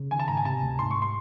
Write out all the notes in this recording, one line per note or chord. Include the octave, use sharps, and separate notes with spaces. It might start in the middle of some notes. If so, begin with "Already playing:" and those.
Already playing: C#3
D#3 G#5
A5
G#2 A#5
G#5
C3 A5
D2
G#2 C6
C#6
C6